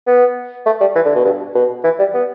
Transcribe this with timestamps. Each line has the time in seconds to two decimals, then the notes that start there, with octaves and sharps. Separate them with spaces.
0.07 B3
0.66 A3
0.81 G3
0.95 E3
1.06 D3
1.16 B2
1.25 G2
1.55 B2
1.84 E3
1.99 G3
2.14 B3